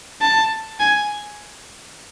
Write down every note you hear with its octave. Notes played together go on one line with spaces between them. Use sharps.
A5
G#5